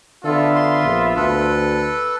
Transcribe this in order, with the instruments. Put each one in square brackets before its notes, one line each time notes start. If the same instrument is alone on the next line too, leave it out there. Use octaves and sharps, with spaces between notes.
[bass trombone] D3 [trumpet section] B3 F4 E5 [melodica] A4
[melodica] C6
[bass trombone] A#1
[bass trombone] D2 [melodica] A4 B4